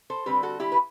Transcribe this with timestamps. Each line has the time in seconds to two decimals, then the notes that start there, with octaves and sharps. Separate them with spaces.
0.10 A4 C5
0.26 D3 G3 C4 G4 B4
0.43 F#4 A4
0.60 E4 G4
0.72 B4